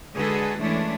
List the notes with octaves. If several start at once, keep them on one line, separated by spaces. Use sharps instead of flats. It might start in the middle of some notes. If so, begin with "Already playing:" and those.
D3 G#3 F#4 G#4 A4 B4
E3 G#3 A3 C#4 D4 E4